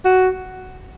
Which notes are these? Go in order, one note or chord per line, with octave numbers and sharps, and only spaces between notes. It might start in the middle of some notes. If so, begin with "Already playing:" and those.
F#4